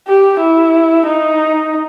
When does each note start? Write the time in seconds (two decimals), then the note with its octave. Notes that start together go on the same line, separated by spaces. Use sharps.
0.08 G4
0.41 E4
1.06 D#4